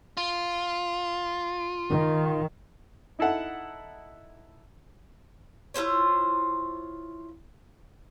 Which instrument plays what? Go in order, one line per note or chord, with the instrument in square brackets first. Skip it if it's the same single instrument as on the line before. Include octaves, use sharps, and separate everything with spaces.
[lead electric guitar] F4
[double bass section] D#3
[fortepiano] D#4 E4 A4 F#5
[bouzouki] E4 F4 C5 C#5